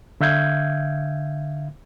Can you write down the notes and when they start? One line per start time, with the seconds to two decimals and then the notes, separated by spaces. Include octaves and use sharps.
0.21 D3 E5 F5 G6 G#6